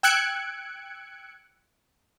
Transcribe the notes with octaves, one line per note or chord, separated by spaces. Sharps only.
G5 E6 F#6 G#6 C#7 D7